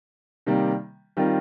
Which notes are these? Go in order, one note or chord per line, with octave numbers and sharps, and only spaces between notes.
C3 D#3 G3 A#3
D#3 G3 C4 F4 A#4